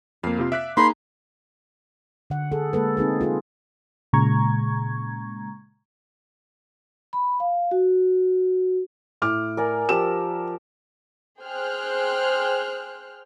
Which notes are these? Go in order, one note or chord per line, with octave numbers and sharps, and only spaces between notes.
F2 A#3 F5
C3 C4 F4
D5 E5 F#6 B6
A#3 D#4 G#4 B5 C6
D3 F#5
G#4 A4 F#5
G#3 A#3 A4 B4
C4 D#4 G#4 B4
F4 G#4 A4
A#2 C#3 G#3 A#5 C#6 G#6
B5
F5
F#4
A2 D6 F6
A#4 D5 G#5
F3 G4 E6 E7
G#4 C5 G5 F6 F#6